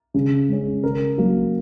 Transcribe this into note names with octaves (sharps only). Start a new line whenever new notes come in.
C#3
G#3 C#4
C#3 A#4
F#3 A#3